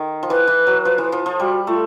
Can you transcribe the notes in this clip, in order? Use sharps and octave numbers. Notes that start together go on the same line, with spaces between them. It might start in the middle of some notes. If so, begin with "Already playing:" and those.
Already playing: D#3
F3
E3 B4
E3
F#3
F3
E3
F3
F3
G3 F#4
A3 F4